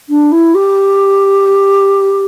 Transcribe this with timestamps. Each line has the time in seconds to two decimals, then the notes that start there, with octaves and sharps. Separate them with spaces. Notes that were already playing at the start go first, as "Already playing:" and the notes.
0.09 D4
0.32 E4
0.55 G4